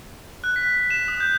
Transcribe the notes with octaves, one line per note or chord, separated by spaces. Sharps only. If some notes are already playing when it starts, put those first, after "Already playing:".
F#6
B6
E7
D#6
G6